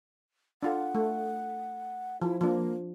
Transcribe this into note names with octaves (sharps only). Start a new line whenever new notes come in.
D4 F4 A4 F#5
A3
F3 E4
F3 A#3 D4